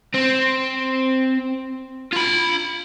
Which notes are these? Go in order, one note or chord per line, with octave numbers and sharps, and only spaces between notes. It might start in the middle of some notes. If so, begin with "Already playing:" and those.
C4
F4 B5